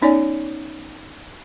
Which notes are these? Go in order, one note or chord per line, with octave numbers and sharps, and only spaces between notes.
B3 C#4 D#4 C#5 D5 G#5